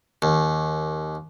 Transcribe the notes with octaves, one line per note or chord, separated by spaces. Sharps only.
D#2